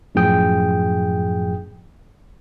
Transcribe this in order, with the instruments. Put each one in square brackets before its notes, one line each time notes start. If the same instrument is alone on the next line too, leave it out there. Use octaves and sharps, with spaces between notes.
[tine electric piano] F#2 A2 F3 G#4 G5 D#6